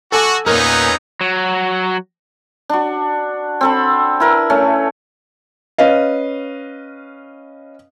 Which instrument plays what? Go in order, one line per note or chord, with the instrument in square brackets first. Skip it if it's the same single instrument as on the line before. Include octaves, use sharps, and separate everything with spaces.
[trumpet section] F#4 [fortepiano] A4 G#5 D6
[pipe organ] E2 B4 C#5 [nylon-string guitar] A#2 A#4 [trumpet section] C#4 D#4 [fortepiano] F6
[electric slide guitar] F#3
[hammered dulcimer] D4 F#4
C4 A4 B5
E4 A#4 B4
A3 C#4
[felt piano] C#4 B4 D#5 F5